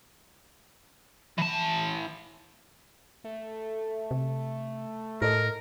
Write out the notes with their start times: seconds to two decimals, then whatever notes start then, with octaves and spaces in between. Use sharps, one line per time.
1.38 E3 A5
3.24 A3
4.11 C3
5.22 A2 A4 A#4 D#5